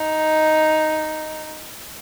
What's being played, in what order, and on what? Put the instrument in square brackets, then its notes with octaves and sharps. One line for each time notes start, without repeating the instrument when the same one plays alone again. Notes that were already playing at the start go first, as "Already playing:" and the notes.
Already playing: [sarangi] D#4